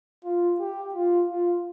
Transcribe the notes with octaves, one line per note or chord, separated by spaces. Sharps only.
F4
G4
F4
F4